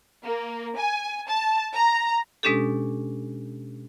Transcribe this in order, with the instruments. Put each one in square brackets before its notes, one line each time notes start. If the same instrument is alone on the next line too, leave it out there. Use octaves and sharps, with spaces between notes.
[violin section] A#3
G#5
A5
A#5
[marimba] B2 G#3 C#4 D4 G4 A4